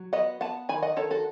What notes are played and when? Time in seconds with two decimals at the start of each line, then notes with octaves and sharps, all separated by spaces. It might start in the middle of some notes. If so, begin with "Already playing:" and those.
Already playing: F#3
0.13 B3 D#5 F#5
0.41 B3 F#5 A5
0.69 D#3 G#5 B5
0.82 D#5 F#5
0.96 D#3 A4 C#5
1.11 F#4 A4